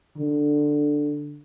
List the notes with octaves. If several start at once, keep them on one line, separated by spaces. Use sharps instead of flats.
D3